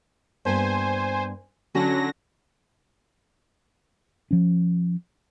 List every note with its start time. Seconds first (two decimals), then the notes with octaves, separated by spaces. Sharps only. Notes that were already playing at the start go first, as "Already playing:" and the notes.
0.45 G2 A#3 B3 C5 G#5
1.75 D3 F#3 C#4 F#4 A5 A#6
4.31 F3 C#4